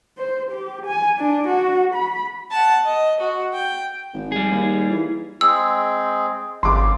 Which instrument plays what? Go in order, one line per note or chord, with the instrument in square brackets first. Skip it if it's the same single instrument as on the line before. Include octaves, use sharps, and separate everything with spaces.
[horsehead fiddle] C5
G4
G#5
D4
F#4
B5
[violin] F#5 A5
D#5
F#4
G5
[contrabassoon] G#1
[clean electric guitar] G3 G#4
[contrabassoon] D#2
E3
[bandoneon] G#3 C4 G#4 [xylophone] E6
[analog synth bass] G#1 [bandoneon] F2 C#3 [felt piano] C6 D6